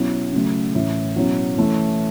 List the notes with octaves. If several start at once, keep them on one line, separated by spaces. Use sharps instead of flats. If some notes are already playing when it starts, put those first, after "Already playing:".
Already playing: B2 F#3 C#4 E4
C#3 F#3 A3
A2 E3 C#4 E4
B2 F#3 C#4 E4
E3 A3 C#4 E4